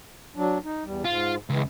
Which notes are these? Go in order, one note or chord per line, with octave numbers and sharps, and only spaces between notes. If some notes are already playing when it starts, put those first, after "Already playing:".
F#3 D4
D#4
E2 G3
G#2 F4
C#2 E3 G#3